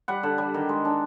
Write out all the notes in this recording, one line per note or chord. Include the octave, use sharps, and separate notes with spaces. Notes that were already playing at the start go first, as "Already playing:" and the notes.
G3 F#5
D3
G3
D#3
G#3
D4